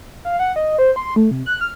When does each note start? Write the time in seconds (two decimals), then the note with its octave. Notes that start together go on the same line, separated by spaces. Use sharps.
0.25 F5
0.39 F#5
0.56 D#5
0.78 C5
0.96 C6
1.16 A3
1.31 C3
1.46 F#6
1.61 F6